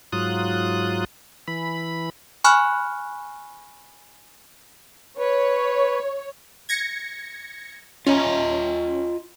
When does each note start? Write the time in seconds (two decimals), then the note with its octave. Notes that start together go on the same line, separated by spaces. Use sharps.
0.13 G#2 F#3 F4 D#6 F#6
1.48 E3 B5
2.44 G#5 B5 C#6 F6 F#6
5.18 B4 C#5
6.69 G#6 A#6 C#7
8.07 C#4 F4 D#5 A#5